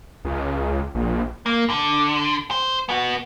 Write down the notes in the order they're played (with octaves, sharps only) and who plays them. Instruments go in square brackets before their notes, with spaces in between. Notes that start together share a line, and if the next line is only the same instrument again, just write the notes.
[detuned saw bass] C#2
A#1
[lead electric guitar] A#3
D3
C5
B3 F#4